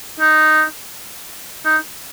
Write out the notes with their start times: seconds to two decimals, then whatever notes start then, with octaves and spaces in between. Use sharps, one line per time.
0.20 D#4
1.65 D#4